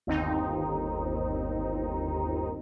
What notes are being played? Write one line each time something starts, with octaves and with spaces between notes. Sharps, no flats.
G1 D#2 C4 D#4